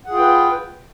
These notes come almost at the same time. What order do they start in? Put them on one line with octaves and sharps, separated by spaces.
F#5 G#4 F4 G5 B4